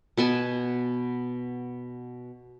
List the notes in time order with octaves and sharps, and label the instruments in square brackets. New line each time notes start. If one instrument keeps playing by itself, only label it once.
[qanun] B2 B3 G#5 A5